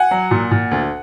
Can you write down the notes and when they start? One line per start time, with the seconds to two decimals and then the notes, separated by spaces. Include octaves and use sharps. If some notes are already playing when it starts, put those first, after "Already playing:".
Already playing: F#5 G#5
0.11 F#3
0.31 A#2
0.51 A#2
0.71 D2